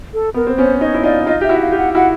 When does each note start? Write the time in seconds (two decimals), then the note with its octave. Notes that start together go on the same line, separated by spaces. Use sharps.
0.14 A4
0.34 B3 A#4
0.47 C4
0.58 B3 C#4 C5
0.81 C#4 D#4 C#5
0.94 E4
1.04 D#4 F4 D5
1.26 D#4 F4 D#5
1.41 G4 E5
1.49 E4 F#4
1.61 F5
1.72 F4 G4
1.77 F#5
1.95 E4 F#4 F#5